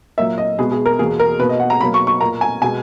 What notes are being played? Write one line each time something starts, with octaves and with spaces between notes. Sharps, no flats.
A#2 F#3 A#3 E5
D#5
B2 G#3 B3 G#4
G#4
A#4
E2 B2 A#3 G#4
A#4
B2 A#3 B4
D#5
F#5
A#5
B2 F#3 A#3 B5
C#6
C#6
A#2 A#3 A#5
G#5
B2 G#3 B3 G#5